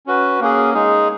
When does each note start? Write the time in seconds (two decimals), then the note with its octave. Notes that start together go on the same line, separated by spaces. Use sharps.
0.06 C#4 F#4 B4
0.40 A#3 C#4 G#4
0.74 G#3 D#4 G#4